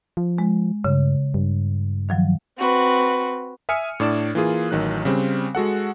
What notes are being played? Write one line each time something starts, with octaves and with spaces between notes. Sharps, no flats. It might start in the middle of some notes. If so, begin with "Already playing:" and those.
F3
G#3
G2 C#3
G2
D#3 F3 F#3
C4 F#4 B4
E5 G#5 D#6 F6 C#7 D#7
A2 D4 D5 E7
E3 A#3 F4 G#4
A1 D#3 F#3 F#6
C#3 G3 C4
G#3 F#4 A4 F#5